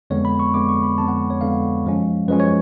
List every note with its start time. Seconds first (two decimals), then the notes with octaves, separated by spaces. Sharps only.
0.10 F2 D3 G#3 B3 C#5
0.25 B5
0.40 C#6
0.54 F2 D3 G#3 B3 D6
0.69 C#6
0.83 B5
0.98 F2 D3 G#3 B3 A5
1.08 F#5
1.30 C#5
1.41 F2 D3 G#3 B3 F5
1.85 F#2 F3 G#3 C#4
2.28 F#2 F3 G#3 C#4 B4
2.40 C#5